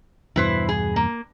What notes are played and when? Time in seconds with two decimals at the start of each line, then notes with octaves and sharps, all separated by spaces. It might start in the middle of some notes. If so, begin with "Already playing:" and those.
0.36 E2 G2 B2 E4 B4 C5
0.69 G#4
0.96 A#3